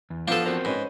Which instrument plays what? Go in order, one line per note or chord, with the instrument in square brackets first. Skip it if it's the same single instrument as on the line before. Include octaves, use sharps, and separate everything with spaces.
[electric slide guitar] E2
[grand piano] F3 B3 [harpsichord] D4 A4 [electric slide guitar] B4 D5 [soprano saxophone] F5
[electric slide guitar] C4 F#4 A#4 [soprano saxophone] C5
[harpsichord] G#2 [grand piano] C#4 B4